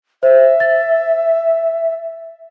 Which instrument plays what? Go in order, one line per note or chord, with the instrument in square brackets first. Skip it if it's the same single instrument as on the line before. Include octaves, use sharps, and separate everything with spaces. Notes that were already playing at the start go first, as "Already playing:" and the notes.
[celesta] C5 [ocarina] E5
[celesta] A6